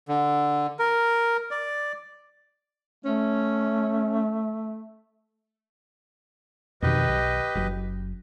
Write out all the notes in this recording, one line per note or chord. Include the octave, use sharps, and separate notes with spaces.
D3
A#4
D5
A3 C#4
F2 B2 D#3 G4 B4 D#5
B1
F#1 F#2